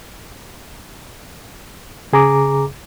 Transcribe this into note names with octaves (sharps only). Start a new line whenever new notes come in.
C#3 G#4 A#5 D6